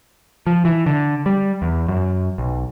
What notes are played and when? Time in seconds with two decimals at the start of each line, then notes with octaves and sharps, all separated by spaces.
0.47 F3
0.65 E3
0.86 D3
1.26 G3
1.62 E2
1.88 F#2
2.38 B1